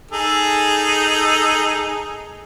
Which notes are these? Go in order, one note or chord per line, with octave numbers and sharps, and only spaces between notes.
D#4 G#4 A4